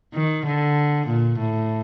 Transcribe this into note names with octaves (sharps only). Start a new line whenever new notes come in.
D#3
D3
A#2
A2